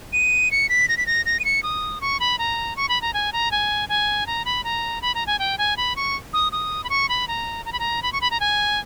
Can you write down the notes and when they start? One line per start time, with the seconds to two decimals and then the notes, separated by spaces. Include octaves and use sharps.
0.13 D#7
0.51 C#7
0.69 B6
0.88 A#6
0.97 B6
1.06 A#6
1.26 A#6
1.40 D#7
1.45 C#7
1.63 D#6
2.01 C#6
2.20 B5
2.39 A#5
2.76 C#6
2.89 B5
3.02 A#5
3.14 G#5
3.33 A#5
3.51 G#5
3.89 G#5
4.26 A#5
4.45 B5
4.64 A#5
5.02 B5
5.14 A#5
5.27 G#5
5.39 G5
5.58 G#5
5.77 B5
5.96 C#6
6.33 D#6
6.52 D#6
6.84 B5
6.89 C#6
7.09 B5
7.28 A#5
7.65 A#5
7.72 B5
7.79 A#5
8.02 B5
8.12 C#6
8.21 B5
8.31 A#5
8.40 G#5